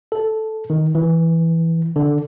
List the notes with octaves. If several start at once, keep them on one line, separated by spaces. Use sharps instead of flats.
A4
D#3
E3
D3